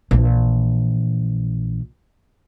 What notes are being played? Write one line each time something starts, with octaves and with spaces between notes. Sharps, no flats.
A#1 E3